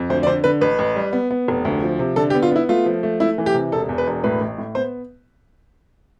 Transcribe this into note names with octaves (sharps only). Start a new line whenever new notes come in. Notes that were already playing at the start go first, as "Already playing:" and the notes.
Already playing: F2
D2 C5
D5
D3 C5
D3 B4
A1 B4
A1
G3
B3
B3
F1
D2
F3
C3
D3 A4
G4
B3
F4
B3 E4
A3 F4
F3
A3
A3 E4
E3
G4
C3
E1 A4
E2
B4
E1
A2 B4
A1
A2
B3 C5